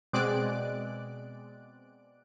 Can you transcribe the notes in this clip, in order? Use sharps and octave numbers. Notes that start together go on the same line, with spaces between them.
B2 G#3 C4 D5 F#6 D7